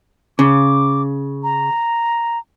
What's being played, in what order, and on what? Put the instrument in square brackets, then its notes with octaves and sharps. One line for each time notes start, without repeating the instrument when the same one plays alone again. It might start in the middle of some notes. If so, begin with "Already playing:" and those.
[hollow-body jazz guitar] C#3 [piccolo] D6
[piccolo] A#5